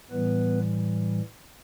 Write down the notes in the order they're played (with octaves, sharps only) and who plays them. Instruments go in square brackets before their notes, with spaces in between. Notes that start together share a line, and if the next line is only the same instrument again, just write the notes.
[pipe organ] A2 E3 G3 B3 B4